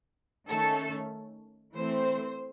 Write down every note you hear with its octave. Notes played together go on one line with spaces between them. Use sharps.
D#3 A3 C#4 A4
E3 A3 C4 C5